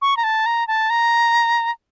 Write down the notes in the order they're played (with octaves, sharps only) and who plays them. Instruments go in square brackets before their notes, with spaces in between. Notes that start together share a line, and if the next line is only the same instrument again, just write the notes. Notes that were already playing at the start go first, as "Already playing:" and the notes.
[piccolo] C#6
A#5
A5
A#5
A5
A#5